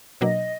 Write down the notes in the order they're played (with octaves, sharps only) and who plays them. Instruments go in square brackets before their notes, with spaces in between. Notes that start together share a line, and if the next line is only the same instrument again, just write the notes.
[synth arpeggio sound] B2 F#3 A#3 D4 [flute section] D#5